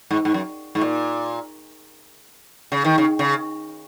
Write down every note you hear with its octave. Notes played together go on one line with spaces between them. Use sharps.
G#2
G#2
F#2
G#2
A#2
C#3
D#3
C#3
C#3